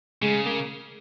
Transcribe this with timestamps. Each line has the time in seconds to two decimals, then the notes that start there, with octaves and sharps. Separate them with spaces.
0.22 C#3 G#3
0.46 A#3